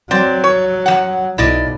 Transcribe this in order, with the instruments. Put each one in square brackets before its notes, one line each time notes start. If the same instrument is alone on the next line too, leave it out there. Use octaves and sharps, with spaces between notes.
[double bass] F#3 [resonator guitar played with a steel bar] C4 D5
[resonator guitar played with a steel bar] C#5
F#2 G3 F#5
[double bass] B1 [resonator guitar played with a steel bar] E4 D5 D#5